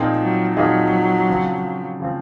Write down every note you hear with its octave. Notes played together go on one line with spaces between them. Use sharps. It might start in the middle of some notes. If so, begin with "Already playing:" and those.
Already playing: A#2 F3 C4 D#4 G#4
F#3
A#2 F3 F#3 C4 D#4 G#4
C#3 F3 C4
C#3 F3 C4